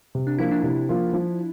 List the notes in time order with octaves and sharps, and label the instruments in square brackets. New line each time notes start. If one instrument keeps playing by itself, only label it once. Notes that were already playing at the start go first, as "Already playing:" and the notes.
[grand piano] C3
[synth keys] D4
[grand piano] F3 A#3 F4 [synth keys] E4
[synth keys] D4
[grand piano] C3
F3 A#3 F4
F3